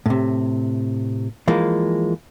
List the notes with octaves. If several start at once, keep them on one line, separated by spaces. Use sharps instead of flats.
A2 C3
E3 F3 G#3 A#3